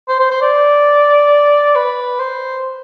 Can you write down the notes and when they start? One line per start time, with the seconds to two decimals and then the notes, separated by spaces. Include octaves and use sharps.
0.09 C5
0.20 C5
0.31 C5
0.42 D5
1.75 B4
2.19 C5